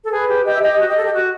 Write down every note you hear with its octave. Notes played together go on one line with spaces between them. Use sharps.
A4
G#4 B4
G4
G4 D#5
E5
G4 D#5
F#4
G4
A4
G4
F#4